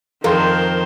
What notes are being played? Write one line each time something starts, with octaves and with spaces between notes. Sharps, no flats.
F2 D#3 A#4 C5 C6